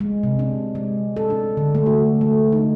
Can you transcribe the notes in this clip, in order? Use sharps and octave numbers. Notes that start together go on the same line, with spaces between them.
G#3
C3
D4
G#3
A4
D4
D3
A3
F#4
A3
D#4